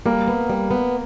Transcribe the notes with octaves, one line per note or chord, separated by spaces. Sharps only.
G3 A#3
B3
G3
B3